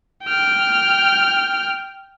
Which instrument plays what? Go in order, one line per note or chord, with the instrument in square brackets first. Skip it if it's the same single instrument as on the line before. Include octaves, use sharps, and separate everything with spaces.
[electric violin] G5 F6